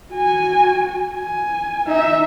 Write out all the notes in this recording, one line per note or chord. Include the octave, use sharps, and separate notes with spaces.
F#4 G#5
G#5
D#4 E5